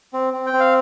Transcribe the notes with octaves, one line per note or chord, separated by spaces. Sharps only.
C4
C4
G5
C4
F5